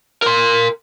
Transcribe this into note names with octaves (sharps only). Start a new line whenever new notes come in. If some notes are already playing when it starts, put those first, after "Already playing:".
A#4 C6